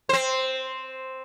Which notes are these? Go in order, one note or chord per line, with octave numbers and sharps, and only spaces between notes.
C4 C5